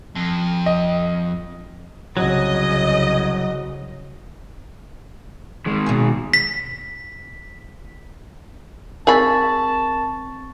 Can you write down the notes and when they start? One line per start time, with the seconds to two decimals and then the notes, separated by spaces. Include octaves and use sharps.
0.16 F2
0.66 D#5
2.17 C2 C#3 F#3 D#5
5.66 D#3 G#3
5.86 B2 G#4
6.34 B6
9.07 C4 G#4 A#4 A5 B5 C#6 A6